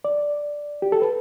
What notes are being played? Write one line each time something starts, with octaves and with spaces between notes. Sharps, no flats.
D5
G4
A4
B4